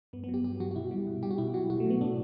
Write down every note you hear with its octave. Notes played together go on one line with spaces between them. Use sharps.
G2 B3
B3
F#3
G4
G2 G4
F#3 F#4
F#4
B2 E4
G3
B2
G3 G4
F#4
B2 E4
F#3 F#4
B2 F#4
A3
F#3 B3
A2 D4